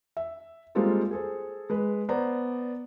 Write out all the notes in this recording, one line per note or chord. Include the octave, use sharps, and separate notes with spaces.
E5
G3 G#3 A#3 C4 F4 A4
G#4 A4 C5
G#3 B4
B3 C5 D5 A#5